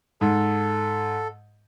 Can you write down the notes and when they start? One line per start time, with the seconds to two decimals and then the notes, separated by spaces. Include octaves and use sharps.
0.21 G#2 A4